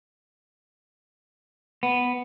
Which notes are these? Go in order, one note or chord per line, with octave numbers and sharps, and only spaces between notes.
B3